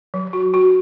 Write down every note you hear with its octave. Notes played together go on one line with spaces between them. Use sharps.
F#3
F#4
F#4